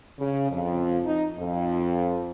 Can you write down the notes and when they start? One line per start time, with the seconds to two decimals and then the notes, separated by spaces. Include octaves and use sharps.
0.18 C#3
0.50 F2
1.04 D#4
1.37 F2